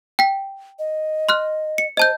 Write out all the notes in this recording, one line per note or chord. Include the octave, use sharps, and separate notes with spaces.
G5 B6
D#5
C6 F6 F#6
C#7
C5 D#5 A5 G6